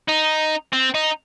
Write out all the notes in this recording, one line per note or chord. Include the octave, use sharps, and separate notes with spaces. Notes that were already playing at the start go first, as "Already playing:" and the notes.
D#4
C4
D#4